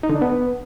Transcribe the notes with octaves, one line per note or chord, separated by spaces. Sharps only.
D#4
D3
D4
B3